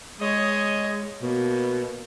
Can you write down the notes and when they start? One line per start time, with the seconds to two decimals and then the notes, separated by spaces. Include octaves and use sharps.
0.20 G#3 C#5 D#5
1.22 B2 A#3